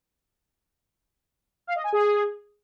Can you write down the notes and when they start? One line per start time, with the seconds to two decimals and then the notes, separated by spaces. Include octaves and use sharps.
1.67 F5
1.76 D#5
1.84 G#5
1.92 G#4